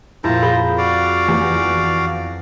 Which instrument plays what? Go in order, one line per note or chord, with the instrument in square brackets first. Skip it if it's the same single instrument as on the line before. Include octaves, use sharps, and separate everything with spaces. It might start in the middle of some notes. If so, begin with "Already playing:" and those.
[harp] F2 A#2 [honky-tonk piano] E4 [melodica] C5 A5 A#5
[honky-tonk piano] G#4 [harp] B5 G6 A#6
[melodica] F#4 D5 F5
[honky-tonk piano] E2